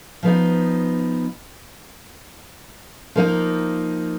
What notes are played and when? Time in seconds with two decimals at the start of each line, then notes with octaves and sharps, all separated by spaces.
0.23 F3 B3 D#4
3.16 F3 A#3 D#4